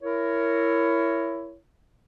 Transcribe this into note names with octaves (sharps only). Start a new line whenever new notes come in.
E4 A#4 C#5